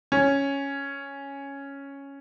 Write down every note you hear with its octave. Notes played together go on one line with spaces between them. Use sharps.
C#4